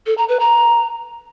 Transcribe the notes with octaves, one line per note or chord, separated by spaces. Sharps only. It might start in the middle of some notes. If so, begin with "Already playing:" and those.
A4
A#5
B4
A#5